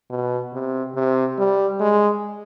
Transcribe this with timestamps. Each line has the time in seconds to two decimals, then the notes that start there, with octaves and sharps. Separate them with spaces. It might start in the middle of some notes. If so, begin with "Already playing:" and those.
0.10 B2
0.53 C3
0.95 C3
1.39 G3
1.80 G#3